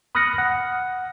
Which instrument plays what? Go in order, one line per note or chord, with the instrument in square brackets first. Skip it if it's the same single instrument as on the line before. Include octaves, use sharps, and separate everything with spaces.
[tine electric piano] B5 D#6 F6 F#6 A#6 C#7
F#5